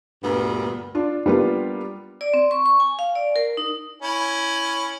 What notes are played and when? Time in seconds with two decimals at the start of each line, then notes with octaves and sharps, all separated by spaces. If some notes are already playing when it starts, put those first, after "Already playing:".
0.23 D2 G2 A#2 B3
0.95 D4 F4
1.26 G3 A#3 B3 D4 F4
2.21 D5
2.34 C4
2.51 C#6
2.66 C#6
2.80 G#5
2.99 F5
3.15 D5
3.36 A#4
3.57 D#4
4.02 C#4 E4